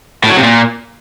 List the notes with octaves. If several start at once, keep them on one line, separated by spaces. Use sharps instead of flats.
A2
F#3
C3
A#2